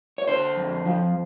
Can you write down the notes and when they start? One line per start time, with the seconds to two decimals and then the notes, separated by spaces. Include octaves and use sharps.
0.18 C#5
0.27 D3 C5
0.56 F2
0.85 F3